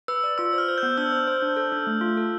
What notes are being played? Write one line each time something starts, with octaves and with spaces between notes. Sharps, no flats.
B4 E6
D5
F4 E6
C5
F6
C5
G6
B3
D4 E6
C5
C5
D4
A4
D4
A3
F4
A4